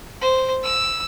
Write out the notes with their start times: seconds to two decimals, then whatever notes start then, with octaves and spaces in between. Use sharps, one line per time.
0.21 C5
0.64 E6